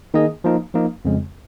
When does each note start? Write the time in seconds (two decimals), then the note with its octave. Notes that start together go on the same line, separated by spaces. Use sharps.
0.14 D#3 A#3 D#4 G#4 D#5
0.44 F3 A#3 D#4
0.74 F3 A#3 D#4
1.05 F2 C#3 G#3